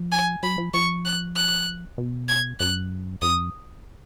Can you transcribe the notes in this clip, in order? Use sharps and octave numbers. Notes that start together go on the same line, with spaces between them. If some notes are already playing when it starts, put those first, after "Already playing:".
Already playing: F3
G#5
F#3 B5
F3
F3 C#6
F#6
F#6
B2
G#6
F#2 F#6
F2 D#6